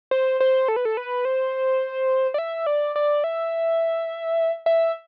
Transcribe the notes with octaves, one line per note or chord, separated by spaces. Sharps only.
C5
C5
A4
B4
A4
B4
C5
D5
E5
D5
D5
E5
E5